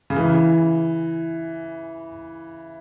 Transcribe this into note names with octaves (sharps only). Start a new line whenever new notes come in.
C#3
E3